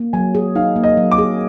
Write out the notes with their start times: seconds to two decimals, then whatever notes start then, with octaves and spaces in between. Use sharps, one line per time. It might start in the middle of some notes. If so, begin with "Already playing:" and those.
Already playing: A#3
0.13 F#3 G#5
0.35 G#4
0.55 D#4 F5
0.76 A#3
0.84 D#5
0.97 F#3
1.12 D6
1.18 G#4